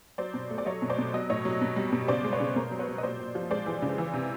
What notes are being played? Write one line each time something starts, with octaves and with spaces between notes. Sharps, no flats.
F#3 C5 D5
B2
A3
D5
F#3 C#5 D#5
B2
C5 D5
B2
F#3 D#5
A2 C#5 D#5
F#3
B2
G3
B2
C#3 C5 D5
G#3
B4 C#5
C#3
B2 A#4 C5
F#3
B4 C#5
F#3
D#5
A#2 C5 D5
A#2
F3
G#3 C5 D5
E3
C#3
E3
C3